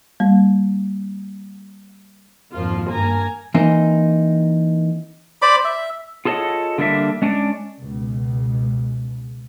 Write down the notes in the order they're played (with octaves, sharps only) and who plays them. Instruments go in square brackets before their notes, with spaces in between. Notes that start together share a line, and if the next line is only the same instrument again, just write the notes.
[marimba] G3 A#3
[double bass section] G#1 F2 [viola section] F3 A#3 F4
[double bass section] G2 [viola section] A#3 G#5 A#5
[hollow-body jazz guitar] E3 A#3 C4 D#4
[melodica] C5 D5 B5 D6
E5
[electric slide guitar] F4 G#4 A4 C#5 D#5 F#5
D3 G3 A#3 D4 F#4 E5
G#3 C#4 D4 D5
[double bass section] C#2 B2